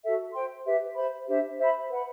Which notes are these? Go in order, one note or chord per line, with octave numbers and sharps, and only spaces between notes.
F#4 A4 E5
C5 G5 C6
G4 B4 E5
C5 E5 B5
D4 G4 C5 E5
C5 E5 B5
B4 F#5 B5